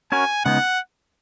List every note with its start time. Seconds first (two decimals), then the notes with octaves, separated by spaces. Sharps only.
0.12 C#4 F#4 A#4 C#5 G#5
0.45 C#3 G#3 B3 D#4 F#5